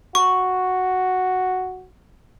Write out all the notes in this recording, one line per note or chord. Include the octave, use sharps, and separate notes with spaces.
F#4 C#6